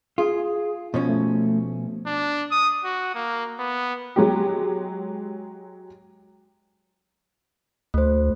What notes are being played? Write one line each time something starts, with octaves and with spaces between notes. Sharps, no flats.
F4 G#4
B2 F3 C#4
A3
D4
D#6
F#4
A#3
B3
F#3 G#3 G4
D2 A3 C5